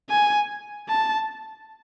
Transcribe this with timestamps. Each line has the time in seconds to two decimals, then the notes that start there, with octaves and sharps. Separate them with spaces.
0.10 G#5
0.89 A5